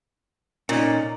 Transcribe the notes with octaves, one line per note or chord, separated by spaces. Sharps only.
A#2 C#4 D#4